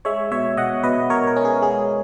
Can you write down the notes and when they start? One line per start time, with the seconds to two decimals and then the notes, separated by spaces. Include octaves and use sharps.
0.05 G#3 C#5 E5
0.31 B2 C#5 E5
0.57 B2 D#5 F#5
0.83 B2 B4 D#5
1.10 B2 A#4 C#5
1.27 A#4
1.36 C#4
1.45 G#4
1.62 G#3 G#4